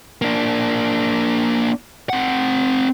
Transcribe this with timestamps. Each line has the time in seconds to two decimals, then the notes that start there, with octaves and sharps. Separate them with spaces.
0.22 A#3 D4
2.09 C4 F#5